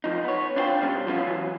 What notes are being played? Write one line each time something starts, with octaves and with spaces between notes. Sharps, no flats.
F3 D#4
B3 C#5
D4 E4 F4 C5 G5
B2 G3 C#4 D4
F3 B3 C#4 E4 F4
E3 F#3